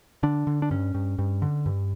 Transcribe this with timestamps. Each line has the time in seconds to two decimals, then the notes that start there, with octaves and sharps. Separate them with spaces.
0.23 D3 D4
0.47 D3
0.62 D4
0.71 G2 C#4
0.94 G2
1.18 G2
1.42 D3
1.66 G2